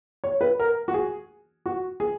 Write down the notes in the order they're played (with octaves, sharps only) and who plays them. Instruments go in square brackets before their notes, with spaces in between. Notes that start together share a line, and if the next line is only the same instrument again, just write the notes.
[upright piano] C#5
B4
A#4
F#4
G#4
F#4
G#4